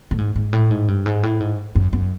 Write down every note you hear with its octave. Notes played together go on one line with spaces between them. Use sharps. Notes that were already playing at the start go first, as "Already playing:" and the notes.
A2
G#2
G#2
A2
G#2
G2
G#2
A2
G#2
F#2
F#2